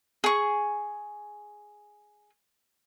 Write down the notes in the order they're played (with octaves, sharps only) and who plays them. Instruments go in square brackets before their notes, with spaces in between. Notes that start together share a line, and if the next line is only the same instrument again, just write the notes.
[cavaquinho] G#4 C#6